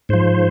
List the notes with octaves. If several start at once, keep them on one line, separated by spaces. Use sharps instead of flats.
G#2 F3 C5